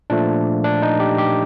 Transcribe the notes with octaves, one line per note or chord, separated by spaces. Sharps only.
A#2 F3 A3 D4
D4
D#4
G4
G4